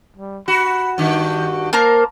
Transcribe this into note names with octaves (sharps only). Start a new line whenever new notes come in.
G3
F#4 B5
G2 D#3 F#4
A#3 A#4 C5 A5